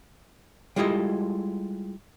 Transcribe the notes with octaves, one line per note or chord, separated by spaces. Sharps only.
G3 G#3 E4 F4 A4 D#5